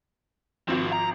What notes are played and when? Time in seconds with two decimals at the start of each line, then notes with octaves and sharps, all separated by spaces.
0.69 G#1 F3 C4 F#4
0.93 A#5